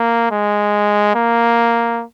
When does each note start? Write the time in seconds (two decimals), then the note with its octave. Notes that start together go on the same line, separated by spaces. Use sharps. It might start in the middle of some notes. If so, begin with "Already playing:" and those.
Already playing: A#3
0.31 G#3
1.15 A#3